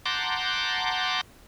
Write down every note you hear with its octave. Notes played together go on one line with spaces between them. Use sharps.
F#5 A5 A#5 C6 D6 G6